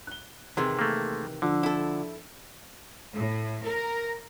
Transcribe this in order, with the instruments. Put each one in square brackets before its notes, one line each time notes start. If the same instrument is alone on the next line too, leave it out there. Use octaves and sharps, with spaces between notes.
[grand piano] F#6 G7
[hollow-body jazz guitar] C3 D#3 E3 [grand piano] G#4 C6 E6
[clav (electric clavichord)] A3 A#3
[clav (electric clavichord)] D3 [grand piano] F3 D4 E6
[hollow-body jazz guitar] E4 A4
[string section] A2
A#4